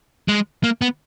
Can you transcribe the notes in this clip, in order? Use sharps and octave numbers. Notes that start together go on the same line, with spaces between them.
G#3
A#3
B3